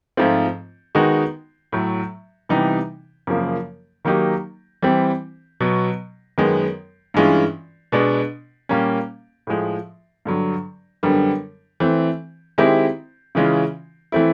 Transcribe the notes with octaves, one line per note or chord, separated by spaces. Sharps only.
G#2 F3 A3 C4 F4
D#3 G#3 B3 D#4 F#4
A2 F#3 A3
C3 E3 G3 B3 D#4
F#2 C#3 F3 A#3
D#3 F#3 A#3 D#4 G4
E3 G3 C4 E4
B2 F#3 B3
F#2 D#3 G#3 B3
G2 E3 G#3 C#4 F4
B2 G#3 B3 D4
A#2 G3 A#3 C#4
A2 F3 G#3
G2 D3 F#3
F#2 D3 G3 B3
E3 A3 C4
D#3 G#3 C4 E4 G4
C#3 E3 G#3 C#4 F4
E3 A3 C4 E4